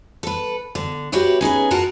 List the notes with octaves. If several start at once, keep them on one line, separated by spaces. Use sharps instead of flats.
A4 B4
D3
F#4 G4 B4 C#5 E5
C#4 D#4 G#4 B4
F4 F#4 A#4 F#5 A5 A#5